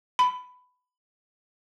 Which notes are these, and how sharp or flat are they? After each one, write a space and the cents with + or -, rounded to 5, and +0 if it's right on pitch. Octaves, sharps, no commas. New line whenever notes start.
B5 +15